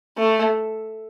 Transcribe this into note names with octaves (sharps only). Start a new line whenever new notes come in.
A3